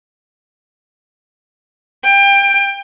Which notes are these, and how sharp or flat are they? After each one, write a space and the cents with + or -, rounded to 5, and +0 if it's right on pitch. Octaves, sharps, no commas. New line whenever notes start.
G5 +25